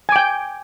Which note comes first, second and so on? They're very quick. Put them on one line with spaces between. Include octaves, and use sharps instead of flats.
G#5 D6 G5